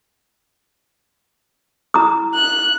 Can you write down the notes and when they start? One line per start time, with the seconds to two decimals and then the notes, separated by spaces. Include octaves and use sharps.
1.94 E4 A#5 D#6
2.35 F#6